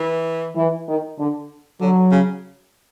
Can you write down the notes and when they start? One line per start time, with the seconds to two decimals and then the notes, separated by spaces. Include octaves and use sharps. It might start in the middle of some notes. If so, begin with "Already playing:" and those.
Already playing: E3
0.56 E3
0.88 D#3
1.18 D3
1.80 D3 F#3
2.11 C#3